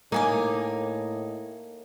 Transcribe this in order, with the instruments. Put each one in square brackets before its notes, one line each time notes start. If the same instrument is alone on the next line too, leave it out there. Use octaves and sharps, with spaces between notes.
[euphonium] A2 [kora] A#3 [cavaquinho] D#4 G#5 D6